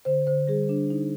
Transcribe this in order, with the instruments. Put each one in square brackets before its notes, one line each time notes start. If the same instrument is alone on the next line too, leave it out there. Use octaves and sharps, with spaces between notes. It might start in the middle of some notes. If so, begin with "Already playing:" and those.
[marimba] D3 C5
D3 C5
G3 G#4
D4
D#4